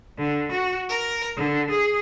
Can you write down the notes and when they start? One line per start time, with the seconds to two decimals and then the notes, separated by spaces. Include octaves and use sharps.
0.18 D3
0.50 F#4
0.88 A#4
1.35 D3
1.68 G#4